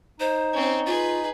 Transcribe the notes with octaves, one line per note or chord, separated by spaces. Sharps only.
D#4 C5
C4 C#4
F4 G#4 B4